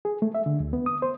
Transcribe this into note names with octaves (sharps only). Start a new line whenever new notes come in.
G#4
A3
E5
D3
D2
B3
D#6
C5